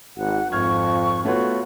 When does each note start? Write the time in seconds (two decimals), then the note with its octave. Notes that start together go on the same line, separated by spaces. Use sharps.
0.17 G#1 F#5
0.52 G#1 F2 C#6 F6 G#6
1.25 A3 B3 F4 F#4 C#5